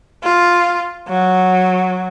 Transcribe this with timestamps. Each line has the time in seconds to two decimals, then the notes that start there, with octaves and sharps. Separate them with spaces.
0.24 F4
1.09 F#3